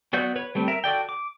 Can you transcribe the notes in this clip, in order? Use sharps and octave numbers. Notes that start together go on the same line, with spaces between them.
F#3 B3 F#4 D5 G6
B4 C#5
G3 A3 C4
A#4 E5
F#4 A4 D5 G5
D6